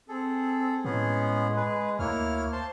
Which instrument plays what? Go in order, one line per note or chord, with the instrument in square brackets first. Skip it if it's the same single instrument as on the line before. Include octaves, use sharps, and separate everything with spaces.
[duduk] C4 [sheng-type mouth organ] G#4 A4
[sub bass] A2 [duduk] G#3 [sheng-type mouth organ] B3 C#4 G#4
[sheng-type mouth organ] G#4 B4
[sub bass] D2 [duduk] A#3 [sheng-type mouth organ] E4 C#5 F6
[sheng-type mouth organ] C5 A5 C6